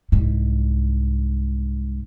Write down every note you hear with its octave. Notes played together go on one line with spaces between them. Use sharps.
C2 G#2